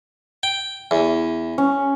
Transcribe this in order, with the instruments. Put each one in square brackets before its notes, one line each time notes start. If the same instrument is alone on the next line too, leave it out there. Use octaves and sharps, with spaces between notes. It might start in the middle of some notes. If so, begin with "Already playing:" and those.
[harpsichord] G5
E2
[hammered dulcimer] C#4